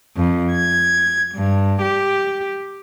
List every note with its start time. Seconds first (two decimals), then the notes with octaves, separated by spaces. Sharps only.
0.16 F2
0.54 G#6
1.34 G2
1.83 G4